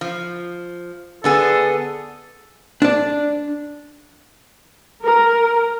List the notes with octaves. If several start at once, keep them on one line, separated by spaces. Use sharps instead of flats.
F3
D3 B3 G#4 A4
D4 D5
A#4